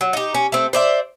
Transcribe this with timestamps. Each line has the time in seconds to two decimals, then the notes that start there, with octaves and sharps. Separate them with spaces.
0.01 F#3
0.13 D#4 G4
0.35 C#4
0.52 A3 C4
0.73 C5 D5 E5